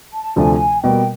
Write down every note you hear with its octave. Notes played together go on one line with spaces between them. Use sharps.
A5
D2 C3 F3 A3 D4 G#5
B2 G3 A#3 G5